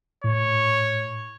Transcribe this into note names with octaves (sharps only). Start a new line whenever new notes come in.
A2 C#5